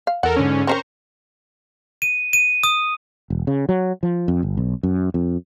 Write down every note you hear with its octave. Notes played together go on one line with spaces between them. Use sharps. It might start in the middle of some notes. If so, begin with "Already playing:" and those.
F5
E2 A4 A#4 F#5
G#2 D3 C#4
C4 C#4 A#4 C5 A#5 C#6
D#7
D#7
D#6
E1
C#3
F#3
F3
F2
G1
B1
F#2
F2